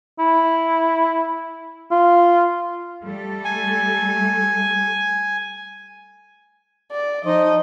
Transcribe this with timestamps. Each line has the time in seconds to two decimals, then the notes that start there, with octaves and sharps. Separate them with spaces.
0.19 E4
1.91 F4
3.03 G3 A3 A4
3.45 G#5
6.91 D5
7.25 F3 D#4 D#5